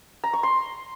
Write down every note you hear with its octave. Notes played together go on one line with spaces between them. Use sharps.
A#5
C#6
C6